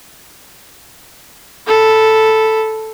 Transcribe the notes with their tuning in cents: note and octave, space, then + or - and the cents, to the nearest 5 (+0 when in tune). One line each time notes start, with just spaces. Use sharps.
A4 +0 B5 +0